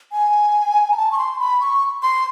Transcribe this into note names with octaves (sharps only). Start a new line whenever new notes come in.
G#5
A#5
A5
C#6
C6
B5
C#6
C6